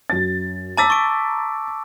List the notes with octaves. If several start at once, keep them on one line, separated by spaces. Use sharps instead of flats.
F#2 A6
A5 A#5 D6 E6 A6 B6
C#6 D7